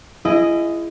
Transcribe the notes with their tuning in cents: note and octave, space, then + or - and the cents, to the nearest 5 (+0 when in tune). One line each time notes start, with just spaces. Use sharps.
E4 +30 G#4 +0 D#5 +0